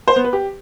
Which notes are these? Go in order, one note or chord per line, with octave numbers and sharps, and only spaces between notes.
C5
B3
B4
G4